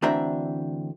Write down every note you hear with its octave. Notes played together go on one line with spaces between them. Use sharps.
D2 E3 C4 D4 E5 A#5